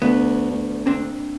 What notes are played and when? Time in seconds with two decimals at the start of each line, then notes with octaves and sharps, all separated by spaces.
0.02 D2 B3
0.50 D2
0.86 A#3 C4 D4